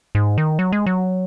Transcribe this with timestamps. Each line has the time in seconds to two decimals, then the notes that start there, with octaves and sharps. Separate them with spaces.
0.15 G#2
0.38 D#3
0.59 F#3
0.72 G#3
0.86 F#3